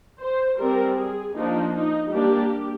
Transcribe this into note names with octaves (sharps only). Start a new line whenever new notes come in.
C5
G3 C4 A#4
G#4
F3 A#3 D4 D#4
D#4
G3 A#3 D4 G4